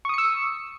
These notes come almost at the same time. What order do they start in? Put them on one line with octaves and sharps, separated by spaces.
C#6 D#6 C#7 E6